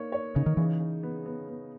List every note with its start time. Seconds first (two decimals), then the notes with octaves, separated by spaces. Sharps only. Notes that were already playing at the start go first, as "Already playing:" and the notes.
Already playing: A#3 D#4 C#5
0.12 C#5
0.35 C#3 D#4
0.46 D#3
0.57 C#3 E3
0.80 C#3
1.03 B3
1.26 B3
1.49 B3